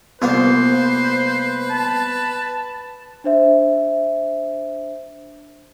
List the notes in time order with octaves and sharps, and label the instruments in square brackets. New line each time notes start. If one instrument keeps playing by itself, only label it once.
[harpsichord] C2 A#3 F4 [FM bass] B3 [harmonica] B4 [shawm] C5
[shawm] A5
[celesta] D4 C5 E5